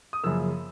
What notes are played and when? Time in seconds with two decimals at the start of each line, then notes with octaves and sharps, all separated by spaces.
0.13 D#6
0.23 F#2 C#3 F3 A#3 E6